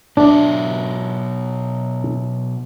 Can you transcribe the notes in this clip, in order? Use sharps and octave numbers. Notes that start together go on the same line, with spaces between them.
B2 F#3 D4 E5